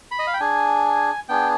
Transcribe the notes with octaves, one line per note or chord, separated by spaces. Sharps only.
B5
D#5
F5
G5
D4 G#4 G#5
B3 D4 G#4 G5